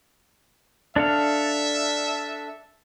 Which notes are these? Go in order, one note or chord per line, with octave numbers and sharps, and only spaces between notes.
D4 A4 E5 F5